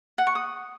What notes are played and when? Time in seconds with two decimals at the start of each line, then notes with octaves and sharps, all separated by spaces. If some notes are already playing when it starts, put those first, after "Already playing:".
0.18 F#5
0.27 C#6
0.35 D#6